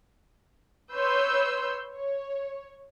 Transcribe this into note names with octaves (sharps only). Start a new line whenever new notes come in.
B4 C#5 C6 E6 G6
C#5